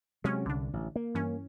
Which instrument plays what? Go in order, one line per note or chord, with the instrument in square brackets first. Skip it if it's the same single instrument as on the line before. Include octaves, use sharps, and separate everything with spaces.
[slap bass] C3 F#3 [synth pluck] G#3 C#4
[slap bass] C2 [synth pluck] D3 D4
[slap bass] A1
A#3
[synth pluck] G2 E3 C#4